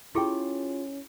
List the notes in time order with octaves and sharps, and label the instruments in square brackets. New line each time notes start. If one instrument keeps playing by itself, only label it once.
[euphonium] C#4 [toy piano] E4 G4 G#4 [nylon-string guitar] F4 G5